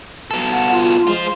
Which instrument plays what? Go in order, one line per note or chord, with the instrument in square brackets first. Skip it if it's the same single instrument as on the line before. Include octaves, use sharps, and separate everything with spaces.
[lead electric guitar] B2 A4
[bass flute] F#5
F4
[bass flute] G#3 [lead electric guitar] F4 C5